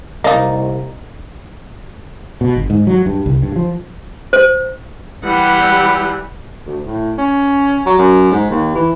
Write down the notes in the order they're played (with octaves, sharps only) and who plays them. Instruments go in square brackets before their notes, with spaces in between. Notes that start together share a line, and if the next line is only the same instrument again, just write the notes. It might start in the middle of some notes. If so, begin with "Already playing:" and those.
[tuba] C2 [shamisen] A#3 D#4 [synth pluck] D5 D#5
[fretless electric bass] B2
G1
G#2
F#3
G2
C2
G2
F3
[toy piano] C5
[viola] E3 G3 [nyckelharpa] G4 F#5
[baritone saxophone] D2
A2
C#4
F#3
F#2
G#2
D#2
E3